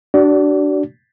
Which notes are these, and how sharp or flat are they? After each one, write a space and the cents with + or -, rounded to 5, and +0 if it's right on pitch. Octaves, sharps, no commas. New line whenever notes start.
D4 +0 F#4 +40 D5 -20